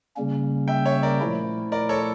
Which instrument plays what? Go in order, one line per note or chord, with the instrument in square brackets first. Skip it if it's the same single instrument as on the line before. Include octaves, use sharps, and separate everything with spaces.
[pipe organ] C#3 G3 A#3 C#4
[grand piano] E5 G5
C#5 E5
A#4 D5
[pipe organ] A#2 F3 A3 E4
[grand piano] A#4 D5
A4 C#5